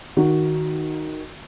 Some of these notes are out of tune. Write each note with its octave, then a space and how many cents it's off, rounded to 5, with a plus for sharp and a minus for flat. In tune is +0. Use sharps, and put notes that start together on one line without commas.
D#3 +0 F#4 +0